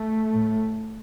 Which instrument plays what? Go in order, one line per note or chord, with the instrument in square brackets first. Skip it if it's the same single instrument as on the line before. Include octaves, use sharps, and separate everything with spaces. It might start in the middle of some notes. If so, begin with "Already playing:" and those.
Already playing: [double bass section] A3
A2